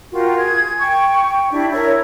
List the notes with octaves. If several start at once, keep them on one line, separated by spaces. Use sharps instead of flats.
F4 F#4 A#4 G5
G#4 G#6
G5 C#6
D4 E4 G4
E4 A#4 C#5